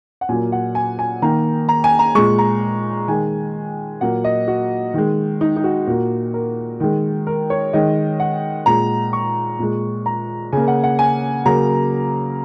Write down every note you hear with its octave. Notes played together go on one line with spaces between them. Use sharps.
F#5
A#2 F#3 A#3 G#5
F#5
G#5
G#5
D#3 A#3 A#5
A#5
G#5
A#5
A#2 G#3 C#6
A#5
D#3 G#3 G#5
A#2 F#3 A#3 F#5
D#5
F#4
D#3 G#3
D#4
D#4
F#4
A#2 A#3 F#4
A#4
D#3 G#3
A#4
C#5
D#3 G#3 D#5
F#5
A#2 G#3 A#5
C#6
A#2 G#3
A#5
C#3 A#3 G#5
F#5
F#5
G#5
C#3 F#3 A#3 A#5